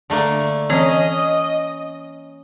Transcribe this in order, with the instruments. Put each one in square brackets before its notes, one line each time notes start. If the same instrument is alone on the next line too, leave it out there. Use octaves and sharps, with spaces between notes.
[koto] D3 A3 A#3
[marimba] E3 C4 G#6 [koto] C#4 A#5 [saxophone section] D#5